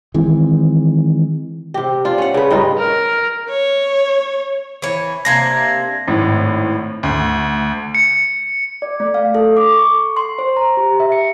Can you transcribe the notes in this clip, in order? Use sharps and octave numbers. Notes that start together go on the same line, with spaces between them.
D#3 E3 G#3 C4
C3 G4
D4 F4
C#4 F#5
C#3 B4
G2 D#4 F4
A#4
C#5
E3 C#5
C3 A#3 D4 G#6 A#6
G#1 A2
D2
C#7
D5
A3
F5
A4
D6
C#6
C6
C5
A#5
G4
E5
C#7